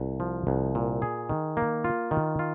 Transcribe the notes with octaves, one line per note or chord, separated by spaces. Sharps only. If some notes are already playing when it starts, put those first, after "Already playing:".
Already playing: C2
F3
C2
A#2
G#4
D#3
A#3
F4
D#3
F4